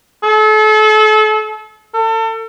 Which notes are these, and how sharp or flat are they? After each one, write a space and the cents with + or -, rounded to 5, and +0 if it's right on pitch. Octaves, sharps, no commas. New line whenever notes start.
A4 -35
A4 +35